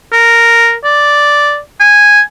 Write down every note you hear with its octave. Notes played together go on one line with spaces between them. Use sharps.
A#4
D5
G#5